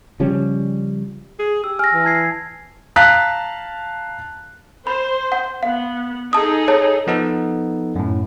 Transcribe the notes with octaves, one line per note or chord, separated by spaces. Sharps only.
C#3 F3 G3 C#4
G#4
G4 E6
G#5 F6 A#6
E3
A5 G#6 C7
F5 A5 A#5 F#6 B6
C5 B5
F#5
B3 F5
D#4 G#4 A4 A5 D#6
C#5 A5
F3 B3 D#4 A4
F#2 A2